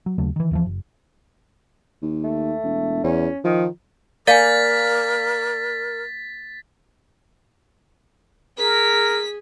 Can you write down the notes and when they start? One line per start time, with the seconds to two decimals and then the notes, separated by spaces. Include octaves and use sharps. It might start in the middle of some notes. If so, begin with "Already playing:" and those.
0.06 F#3
0.18 D#2 C#3 F#3 A3
0.36 D#3 E3
0.51 D#2 E3 F3
0.65 F#1
2.02 D#2
2.24 A3
2.64 E1
3.04 E2 C#4
3.44 D#3 F3
4.27 A#3 A#4 D5 F5 G#5 A6 B6
8.58 G#4 A#4 B6